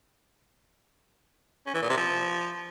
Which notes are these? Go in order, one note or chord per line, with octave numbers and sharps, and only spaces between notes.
C#4
E3
A#2
C3
F3